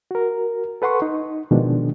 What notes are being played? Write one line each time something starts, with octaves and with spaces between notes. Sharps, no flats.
F#4 A#4
A4 B4 F#5 C6 C#6
D#4
B2 D#3 F3 G#3 D4